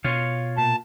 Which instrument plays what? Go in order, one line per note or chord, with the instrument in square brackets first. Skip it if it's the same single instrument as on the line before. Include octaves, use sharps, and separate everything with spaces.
[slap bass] B2 [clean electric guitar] F4 C#5 F5
[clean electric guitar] A#2 [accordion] A5